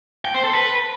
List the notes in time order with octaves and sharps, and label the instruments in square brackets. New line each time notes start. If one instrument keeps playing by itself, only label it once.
[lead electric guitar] G5
C5
A4
B4